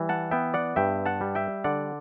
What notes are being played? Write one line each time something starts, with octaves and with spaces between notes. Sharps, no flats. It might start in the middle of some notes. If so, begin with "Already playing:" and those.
Already playing: E3 G3
F#5 A5
B3 E5 G5
D5 F#5
G2 E5 G5
F#5 A5
G3
E5 G5
D3 D5 F#5